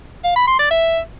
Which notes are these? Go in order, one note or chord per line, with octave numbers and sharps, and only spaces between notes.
F5
B5
C6
D5
E5